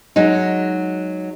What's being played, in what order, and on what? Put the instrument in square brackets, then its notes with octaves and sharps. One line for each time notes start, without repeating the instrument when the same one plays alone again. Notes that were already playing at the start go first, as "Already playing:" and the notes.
[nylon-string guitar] F#3 G#3 D#4